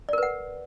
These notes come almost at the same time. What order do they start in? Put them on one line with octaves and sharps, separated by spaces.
D5 A#4 B4 F#5